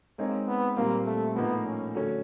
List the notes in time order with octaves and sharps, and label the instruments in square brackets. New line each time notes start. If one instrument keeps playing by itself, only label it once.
[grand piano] G#3 C4 D#4 G#4 C#5 [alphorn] A#3
[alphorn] B3
[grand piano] A#2 G3 C4 F4 [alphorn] A#3
[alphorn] A3
[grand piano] A2 F3 A#3 D#4 [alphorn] B3
[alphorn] C#4
[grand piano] D3 F#3 A3 C#4